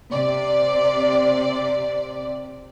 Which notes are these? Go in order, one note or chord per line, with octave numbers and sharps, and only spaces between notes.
C3 D5